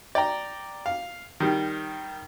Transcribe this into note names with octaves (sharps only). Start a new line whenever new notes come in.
D5 G5 A#5
F5
D#3 G3